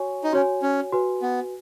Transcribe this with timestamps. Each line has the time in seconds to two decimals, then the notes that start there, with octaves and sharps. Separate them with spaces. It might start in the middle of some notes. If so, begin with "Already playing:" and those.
Already playing: F#4 C#5 G#5 C#6
0.24 D#4
0.33 C#4 F#4 C#5 G#5
0.62 C#4
0.92 F#4 B4 G#5
1.22 B3